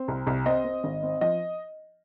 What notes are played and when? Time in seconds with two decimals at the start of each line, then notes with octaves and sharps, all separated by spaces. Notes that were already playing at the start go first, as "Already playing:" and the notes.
Already playing: C4
0.08 C2
0.27 C2
0.46 C4 D#5
0.64 C4
0.84 G#1
1.03 C4
1.21 F3 D#5